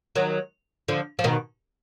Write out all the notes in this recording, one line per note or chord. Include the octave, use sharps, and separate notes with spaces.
D#3 F#3
D3 F3
F3
B2 D#3